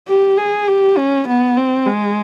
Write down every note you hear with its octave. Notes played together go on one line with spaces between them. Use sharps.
G4
G#4
G4
C#4
B3
C4
G#3